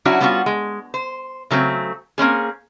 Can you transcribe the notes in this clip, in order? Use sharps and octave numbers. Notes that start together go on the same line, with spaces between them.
F#3 C#4 D4 E4 F#4
G3 B3 C#4 F4 F#4
G#3
C5
C#3 F#3 A3 C4
A#3 C4 C#4 G#4